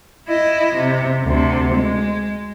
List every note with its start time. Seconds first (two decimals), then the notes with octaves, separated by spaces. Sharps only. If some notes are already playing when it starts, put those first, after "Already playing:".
0.28 E4 D#5
0.75 C3
1.24 D2 C3
1.75 G#3